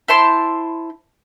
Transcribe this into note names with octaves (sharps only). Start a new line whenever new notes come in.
E4 C5 A5 C6